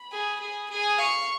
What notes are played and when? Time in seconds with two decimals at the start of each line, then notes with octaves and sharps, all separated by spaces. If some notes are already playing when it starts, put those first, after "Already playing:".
Already playing: B5
0.12 G#4
0.41 G#4
0.70 G#4
0.98 F5 C#6